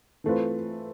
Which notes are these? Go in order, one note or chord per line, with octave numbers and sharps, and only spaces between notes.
E3 A3 C4 F4 B4